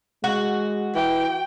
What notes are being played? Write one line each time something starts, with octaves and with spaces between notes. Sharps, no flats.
G#3 F#4
E3 G5